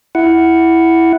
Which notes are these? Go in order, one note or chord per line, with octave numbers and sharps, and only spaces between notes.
E4 F#5